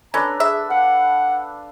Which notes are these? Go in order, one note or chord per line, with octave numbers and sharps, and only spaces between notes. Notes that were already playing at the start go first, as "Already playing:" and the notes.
C#4 D4 A4 B4 A#5
G#4 E5
F5 F#5